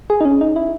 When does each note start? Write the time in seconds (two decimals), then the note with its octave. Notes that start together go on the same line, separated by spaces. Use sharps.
0.10 G#4
0.21 D#4
0.25 C#4
0.41 D#4
0.56 E4